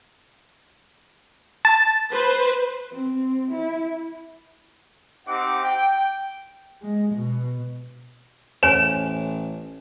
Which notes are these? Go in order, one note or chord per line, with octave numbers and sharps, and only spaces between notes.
A5
B4 C5
C4
E4
C4 D#4 G4 F#5 D6
G5
G#3
B2
A1 C5 C#5 G#5 E7